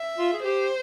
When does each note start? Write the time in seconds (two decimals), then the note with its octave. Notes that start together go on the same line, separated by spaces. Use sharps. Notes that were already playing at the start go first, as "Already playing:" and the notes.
Already playing: E5
0.18 F4
0.33 G#4
0.44 G4 C5